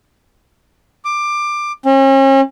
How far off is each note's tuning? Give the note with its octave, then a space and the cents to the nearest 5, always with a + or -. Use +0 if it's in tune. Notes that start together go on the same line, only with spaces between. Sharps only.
D6 +15
C#4 -40